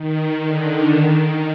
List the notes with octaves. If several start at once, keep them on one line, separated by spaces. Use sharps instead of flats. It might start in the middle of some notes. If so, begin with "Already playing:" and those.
Already playing: D#3
D3
D#3